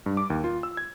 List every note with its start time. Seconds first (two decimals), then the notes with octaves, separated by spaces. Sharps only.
0.06 G2
0.17 D6
0.30 D#2
0.44 F4
0.63 E6
0.77 G#6